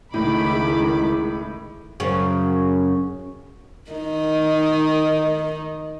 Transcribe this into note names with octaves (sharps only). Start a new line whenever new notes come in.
C#2 A2 D#3 B5 D6
E4 G#4
F#2 C#3
D#3 D#4